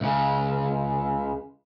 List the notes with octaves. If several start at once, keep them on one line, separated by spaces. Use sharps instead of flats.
C#2 C#3